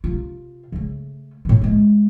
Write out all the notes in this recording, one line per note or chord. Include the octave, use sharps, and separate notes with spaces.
C3 F4
C#3 A3
A2 D#3
G#3 A3